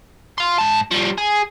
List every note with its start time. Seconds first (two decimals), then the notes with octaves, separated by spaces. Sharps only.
0.38 F5 C6
0.58 G#2 A5
0.91 F3 G3
1.18 G#4